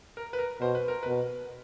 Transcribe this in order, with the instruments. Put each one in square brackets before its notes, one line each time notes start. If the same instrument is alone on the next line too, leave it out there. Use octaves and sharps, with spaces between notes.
[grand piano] A#4
B4
A#4
[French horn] B2 [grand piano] C5
[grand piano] B4
A#4
[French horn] B2 [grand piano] B4